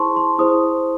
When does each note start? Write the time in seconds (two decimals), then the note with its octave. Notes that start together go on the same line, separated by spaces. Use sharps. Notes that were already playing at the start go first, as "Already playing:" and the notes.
Already playing: E4 G#4 C5 A5 C6 C#6
0.16 C6
0.39 E4 G#4 C5 D#6